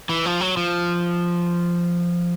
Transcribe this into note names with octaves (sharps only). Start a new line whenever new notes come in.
E3
F3
F#3
F3